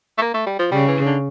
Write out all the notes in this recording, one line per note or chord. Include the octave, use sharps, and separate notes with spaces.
A3
A#3
A3
G3
F3
C#3 G3
E3
D3